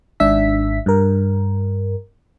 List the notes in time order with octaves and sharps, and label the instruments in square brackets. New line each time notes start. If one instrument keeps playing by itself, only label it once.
[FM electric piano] G#1 G#2 D4 E5 B6
G2 A#4